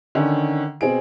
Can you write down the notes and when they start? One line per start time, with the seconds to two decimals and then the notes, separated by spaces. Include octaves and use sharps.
0.15 D3 D#3 C#4
0.81 B2 C4 G#4 D7